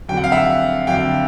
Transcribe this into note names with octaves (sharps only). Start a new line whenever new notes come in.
F2 D3 F#3 G5
F#5
F5
E5 F#5
F2 D3 F#3 F5 G5